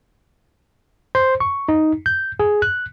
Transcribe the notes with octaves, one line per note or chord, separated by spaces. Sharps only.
C5
C#6
D#4
G6
G#4
F#6